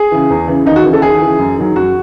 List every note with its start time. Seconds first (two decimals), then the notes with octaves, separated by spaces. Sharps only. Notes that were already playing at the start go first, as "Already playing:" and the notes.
Already playing: G#4
0.11 C#3 E3
0.30 E2
0.47 C#3 E3
0.66 D#2 D#4
0.76 F#4
0.85 C#3 E3
0.93 A4
1.02 D#2 G#4
1.21 C#3 E3
1.39 F#2
1.58 D#3 F#3
1.76 F#2 F#4